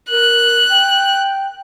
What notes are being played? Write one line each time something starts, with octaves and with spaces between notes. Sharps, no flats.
A#4 F#6
G5